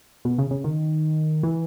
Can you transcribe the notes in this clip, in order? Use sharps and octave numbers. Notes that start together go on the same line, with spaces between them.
B2
C#3
C#3
D#3
E3